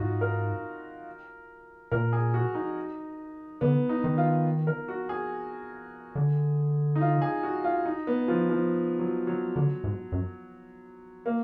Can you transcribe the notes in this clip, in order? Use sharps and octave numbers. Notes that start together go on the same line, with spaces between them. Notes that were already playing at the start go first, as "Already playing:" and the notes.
Already playing: G#2 D#4 F4 F#4
A#4
A#2 A#4
G#4
F#4
D#4
D3 B3
D#4
D#3
F4
A#4
F#4
G#4
D3
D#4
F4
G#4
F#4
F4
D#4
B3
F3
F3
F#3
F#3
D3
G#2
F#2
A#3